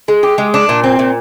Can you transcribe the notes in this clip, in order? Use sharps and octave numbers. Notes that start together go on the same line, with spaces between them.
G#3
G4
G#3
D4
A#2
C4
A#2